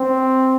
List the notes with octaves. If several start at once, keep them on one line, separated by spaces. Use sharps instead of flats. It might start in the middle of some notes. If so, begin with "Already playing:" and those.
Already playing: C4